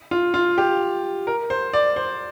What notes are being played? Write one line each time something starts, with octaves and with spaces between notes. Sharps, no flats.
F4
F4
G4
A#4
C5
D5
C5